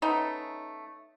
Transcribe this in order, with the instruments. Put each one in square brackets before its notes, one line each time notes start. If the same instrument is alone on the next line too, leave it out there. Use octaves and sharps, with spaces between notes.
[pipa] A3 B3 C#4 D#4